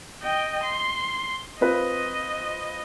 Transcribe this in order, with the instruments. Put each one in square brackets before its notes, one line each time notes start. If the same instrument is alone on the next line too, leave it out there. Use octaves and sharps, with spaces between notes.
[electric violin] D#5 G5
C6
[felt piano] C4 F4 B4 [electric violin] D#5